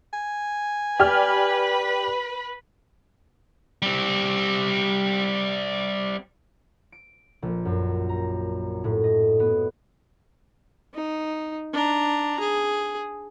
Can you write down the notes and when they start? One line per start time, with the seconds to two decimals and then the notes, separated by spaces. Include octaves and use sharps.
0.13 G#5
1.00 G4 B4 D5 B5 F6
3.82 G3 C4
6.92 D7
7.42 A#1
7.65 F#2
8.09 A#5
8.84 A2
9.04 D#5
9.40 B3
10.94 D#4
11.74 D4 A#5
12.40 G#4